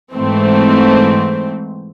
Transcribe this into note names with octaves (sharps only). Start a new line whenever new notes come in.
G#2 E3 A3 C4